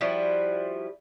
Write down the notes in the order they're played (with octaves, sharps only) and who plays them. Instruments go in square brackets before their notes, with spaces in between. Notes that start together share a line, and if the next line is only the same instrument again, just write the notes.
[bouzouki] F3 G3 E4 F#4